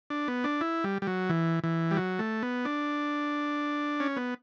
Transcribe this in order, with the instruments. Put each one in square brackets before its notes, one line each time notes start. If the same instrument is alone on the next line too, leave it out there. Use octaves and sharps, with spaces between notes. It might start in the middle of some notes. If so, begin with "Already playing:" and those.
[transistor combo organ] D4
B3
D4
E4
G3
G3
F#3
E3
E3
G3
F#3
A3
B3
D4
C#4
B3